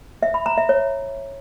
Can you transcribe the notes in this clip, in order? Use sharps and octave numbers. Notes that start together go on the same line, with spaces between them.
E5
B5
A#5
E5
C#5